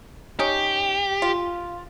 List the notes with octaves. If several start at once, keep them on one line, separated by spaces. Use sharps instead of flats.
C#4 D#4 G4
F4